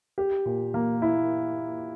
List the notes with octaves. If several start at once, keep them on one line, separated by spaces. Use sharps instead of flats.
G4
A#2
A#3
E4